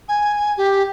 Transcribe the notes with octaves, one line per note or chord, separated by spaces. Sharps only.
G#5
G4